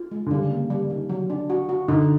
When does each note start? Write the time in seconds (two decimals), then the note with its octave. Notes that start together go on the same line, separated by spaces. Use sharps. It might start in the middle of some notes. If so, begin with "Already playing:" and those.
Already playing: F4
0.11 G#3
0.26 D3
0.31 C#3 G3
0.51 A#3
0.70 G3
0.90 D#3
1.09 F#3
1.30 D4
1.50 F#4
1.69 F#4
1.88 D3 D#4